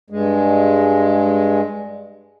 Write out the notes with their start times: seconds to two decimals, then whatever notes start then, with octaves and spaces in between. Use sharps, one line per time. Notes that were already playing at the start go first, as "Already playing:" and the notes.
0.10 G2 G#3